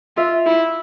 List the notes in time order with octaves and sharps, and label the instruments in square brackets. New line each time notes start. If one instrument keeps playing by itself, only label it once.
[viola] F4 [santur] E5
[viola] E4